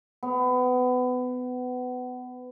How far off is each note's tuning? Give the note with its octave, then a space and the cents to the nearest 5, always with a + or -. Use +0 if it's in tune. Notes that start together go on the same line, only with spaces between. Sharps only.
B3 +25